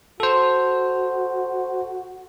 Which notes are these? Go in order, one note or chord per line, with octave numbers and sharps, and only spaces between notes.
F#4 A4 C5